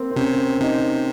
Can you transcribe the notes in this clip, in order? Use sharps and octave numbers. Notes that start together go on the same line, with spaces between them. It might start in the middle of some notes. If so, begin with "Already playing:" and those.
Already playing: A#3 C4
C4
C3 C#4
C3 D#4